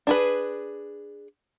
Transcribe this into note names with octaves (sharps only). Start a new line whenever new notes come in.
D4 G#4 B4